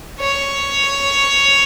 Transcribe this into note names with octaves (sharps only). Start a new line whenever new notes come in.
C#5